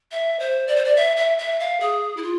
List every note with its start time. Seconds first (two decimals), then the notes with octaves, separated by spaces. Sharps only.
0.11 E5
0.40 C5
0.67 D5
0.76 C5
0.85 D5
0.96 E5
1.17 E5
1.38 E5
1.60 F5
1.80 G#4
2.17 E4
2.22 F4